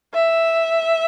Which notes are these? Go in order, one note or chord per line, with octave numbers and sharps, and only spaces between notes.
E5